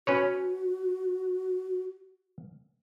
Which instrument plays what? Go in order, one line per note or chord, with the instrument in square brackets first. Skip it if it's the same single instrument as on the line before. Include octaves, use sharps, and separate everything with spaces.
[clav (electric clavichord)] C#4 B4 C#5 [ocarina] F#4